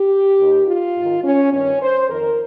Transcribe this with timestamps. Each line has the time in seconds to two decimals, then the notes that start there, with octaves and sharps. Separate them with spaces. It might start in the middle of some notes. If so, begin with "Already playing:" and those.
Already playing: G4
0.40 D#2 D#3
0.68 F4
0.96 G#2 D#3
1.24 C#4
1.52 G2 D#3 C#4
1.81 C5
2.09 F2 D#3 A#4